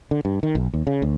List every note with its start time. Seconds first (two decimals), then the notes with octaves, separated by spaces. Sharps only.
0.11 D3
0.25 G2
0.43 D#3
0.55 B1
0.74 D#2
0.87 C#3
1.02 D2